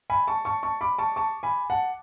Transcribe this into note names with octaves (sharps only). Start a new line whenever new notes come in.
G#5 B5
A5 C#6
A5 C#6
A5 C#6
B5 D6
A5 C#6
A5 C#6
G#5 B5
F#5 A5